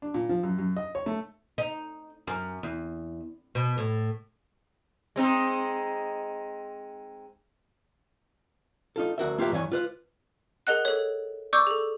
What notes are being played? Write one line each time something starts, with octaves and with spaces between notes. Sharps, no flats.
D4
A#2
F3
F#2
F#2
D#5
C#5
A3
D#4
F#2
E2
B2
A2
G#3 C4 D#4
D#4 F4 A4
D2 F#4 A#4 E5
A#3 F4 G4 B4 E5
G2 E3 F4 C#5 G#5
F4 B4 C5
G#4 A#4 D#5 F#5 F#6
A4 C#5
D5 C#6 D6 E6 G6
G#4 A4